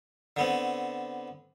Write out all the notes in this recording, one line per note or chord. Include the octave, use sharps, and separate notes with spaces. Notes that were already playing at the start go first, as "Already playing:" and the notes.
D3 B3 C4